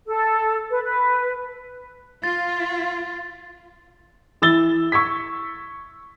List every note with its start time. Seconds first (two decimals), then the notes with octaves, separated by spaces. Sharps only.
0.06 A4
0.70 B4
0.83 B4
2.24 F4 A6
4.42 E3 E6 A6 G7
4.92 C#6 E6 G#6 B6